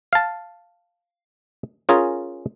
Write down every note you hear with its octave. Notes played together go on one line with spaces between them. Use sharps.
F5 A5
C#4 F4 G#4 A#4